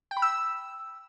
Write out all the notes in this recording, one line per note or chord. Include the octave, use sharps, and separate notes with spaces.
G5
B5
E6